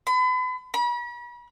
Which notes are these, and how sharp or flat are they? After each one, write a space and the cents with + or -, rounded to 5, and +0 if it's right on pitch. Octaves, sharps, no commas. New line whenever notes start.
B5 +40
B5 -40